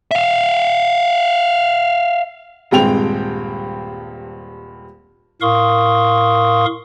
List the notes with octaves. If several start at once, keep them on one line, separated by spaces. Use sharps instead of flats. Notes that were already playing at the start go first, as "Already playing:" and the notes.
E5 F5
D#1 G2 G#3 C4 G5 F7
A2 A#4 F5 C6 C#6 D#6